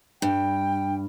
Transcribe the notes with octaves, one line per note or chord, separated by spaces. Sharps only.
G2 G5